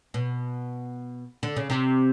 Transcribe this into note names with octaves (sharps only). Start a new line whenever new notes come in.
B2
D3
C#3
C3